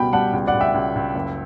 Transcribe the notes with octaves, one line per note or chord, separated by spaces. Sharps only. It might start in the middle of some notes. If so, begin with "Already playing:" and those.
Already playing: C#2 B2 G3 G5 B5
G3 F#5 A5
C#2
D5 F#5
C#2
E5 G5
C#2
C#2
F#1